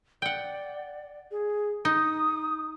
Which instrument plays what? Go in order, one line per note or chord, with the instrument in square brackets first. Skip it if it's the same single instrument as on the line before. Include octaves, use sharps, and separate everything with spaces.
[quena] D5 [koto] F#5 G5
[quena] G#4
[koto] D#4 [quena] D#6